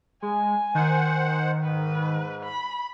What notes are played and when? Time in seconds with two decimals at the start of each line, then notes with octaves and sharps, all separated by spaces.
0.22 G#3 G#5
0.75 D#3 C5 F#5
1.63 G#2 B4
2.43 B5